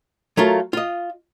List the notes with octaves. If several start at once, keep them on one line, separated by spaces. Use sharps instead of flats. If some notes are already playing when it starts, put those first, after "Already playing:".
F#3 A3 F4 A#4
F4 D#5